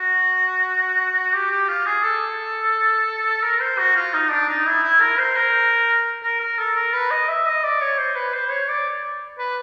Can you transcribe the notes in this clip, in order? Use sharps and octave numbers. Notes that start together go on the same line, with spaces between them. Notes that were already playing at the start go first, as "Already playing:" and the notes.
Already playing: F#4
G4
G4
F4
G#4
A4
A#4
C5
F#4
F4
D#4
D4
D#4
E4
E4
A#4
C5
A#4
A#4
A#4
A4
A#4
B4
D#5
E5
D#5
D5
C#5
C5
B4
C5
C#5
D5
B4